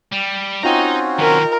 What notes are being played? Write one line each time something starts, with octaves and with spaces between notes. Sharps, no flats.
G3
C4 C#4 D#4 F4 F#4 D#5 G5 A#5
D#3 A#4 B4